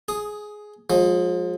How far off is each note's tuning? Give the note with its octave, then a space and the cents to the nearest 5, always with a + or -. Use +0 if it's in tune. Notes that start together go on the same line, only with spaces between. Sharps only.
G#4 +10 D#6 +0
F3 +35 G#3 +0